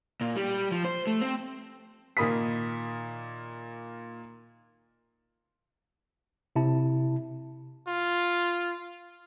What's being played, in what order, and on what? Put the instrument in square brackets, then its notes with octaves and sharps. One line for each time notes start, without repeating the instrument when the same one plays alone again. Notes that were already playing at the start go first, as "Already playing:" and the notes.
[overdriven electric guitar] A#2
G3
F3
C5
A3
C4
[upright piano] A#2 D#3 A#3 B5 D#6 B6
[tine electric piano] C3 E4 A5
[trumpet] F4